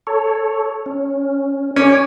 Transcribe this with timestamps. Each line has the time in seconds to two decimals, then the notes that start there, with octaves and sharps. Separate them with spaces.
0.07 A4 C#5
0.86 C#4
1.76 C#4 C#5 G#5 D6